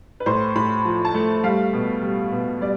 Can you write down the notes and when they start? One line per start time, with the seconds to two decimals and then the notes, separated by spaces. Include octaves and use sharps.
0.20 B4
0.26 A2 C5
0.55 A2 B5
0.85 F3
1.05 A5
1.14 A3
1.43 G3 F5
1.73 B2
2.02 G3
2.32 B2
2.61 G3 D5